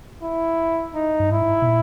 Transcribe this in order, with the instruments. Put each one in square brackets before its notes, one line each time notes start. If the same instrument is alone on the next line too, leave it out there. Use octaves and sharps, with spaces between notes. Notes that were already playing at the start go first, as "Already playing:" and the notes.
[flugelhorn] E4
D#4
[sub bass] G2
[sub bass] G#2 [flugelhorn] E4
[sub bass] B2
A#2